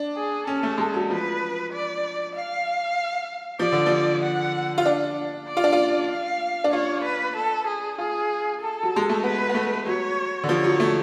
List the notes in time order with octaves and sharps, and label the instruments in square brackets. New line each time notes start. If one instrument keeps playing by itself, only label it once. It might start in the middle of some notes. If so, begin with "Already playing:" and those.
Already playing: [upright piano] D4
[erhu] G#4
[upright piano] C#4 [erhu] A4
[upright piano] A3
G#3
F#3
[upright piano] F3 [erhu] B4
[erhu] D5
F5
[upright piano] F3 [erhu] D5
[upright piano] D3
F3
[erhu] F#5
[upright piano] F4
D4
[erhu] D5
[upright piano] F4
D4
F4
[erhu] F5
[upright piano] D4
[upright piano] F4 [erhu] C#5
[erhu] B4
A4
G#4
[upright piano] F4 [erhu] G#4
[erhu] A4
[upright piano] F#3
G#3
A3
[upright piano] B3 [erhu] B4
[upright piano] B3
A3
[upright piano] F#3 [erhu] C#5
[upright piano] D3
[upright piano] F3 [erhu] C#5
[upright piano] F#3
A3